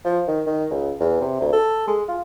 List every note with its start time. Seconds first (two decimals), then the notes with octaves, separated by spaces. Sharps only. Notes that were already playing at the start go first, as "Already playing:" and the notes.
0.05 F3
0.27 D#3
0.47 D#3
0.71 C#2
1.00 E2
1.21 C3
1.40 D2
1.52 A4
1.88 G#3
2.08 F4